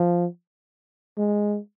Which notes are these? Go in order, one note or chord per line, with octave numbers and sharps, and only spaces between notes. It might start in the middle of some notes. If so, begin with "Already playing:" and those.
Already playing: F3
G#3